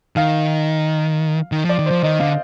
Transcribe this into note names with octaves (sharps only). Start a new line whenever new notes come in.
D#3 F5
D#3
F3 D5
D#3
F3 C5
D#3 D#5
D3 F5